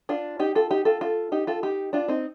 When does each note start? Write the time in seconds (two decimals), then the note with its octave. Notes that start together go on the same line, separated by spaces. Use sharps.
0.09 D4 F4
0.39 D#4 G4
0.55 F4 A4
0.70 D#4 G4
0.85 F4 A4
1.01 F4 A4
1.32 D#4 G4
1.47 F4 A4
1.63 D#4 G4
1.93 D4 F4
2.08 C4 D#4